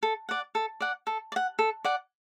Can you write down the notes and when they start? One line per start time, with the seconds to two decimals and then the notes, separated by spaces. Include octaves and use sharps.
0.03 A4
0.29 D5 F#5
0.55 A4
0.80 D5 F#5
1.07 A4
1.32 D5
1.36 F#5
1.59 A4
1.84 D5 F#5